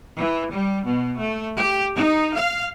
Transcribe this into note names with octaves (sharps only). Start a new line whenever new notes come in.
E3
G3
B2
A3
G4
D#4
F5